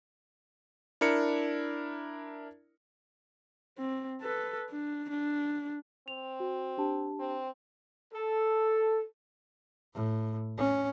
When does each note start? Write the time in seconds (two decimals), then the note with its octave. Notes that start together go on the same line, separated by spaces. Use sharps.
1.01 D4 E4 A#4 C#7
3.78 C4
4.22 A4 B4
4.71 D4
5.11 D4
6.08 C4 F7
6.40 F#4
6.78 D4 G4 A5
7.19 C4
8.14 A4
9.95 A2
10.58 C#4